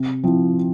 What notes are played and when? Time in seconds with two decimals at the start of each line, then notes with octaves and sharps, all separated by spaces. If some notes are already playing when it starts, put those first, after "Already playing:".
Already playing: C3
0.23 F3 C4 E4